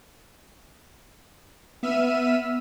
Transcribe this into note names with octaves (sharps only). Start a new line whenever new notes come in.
B3 E5 E6 F6 D#7